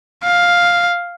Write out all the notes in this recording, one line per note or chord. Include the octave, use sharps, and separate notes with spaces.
F5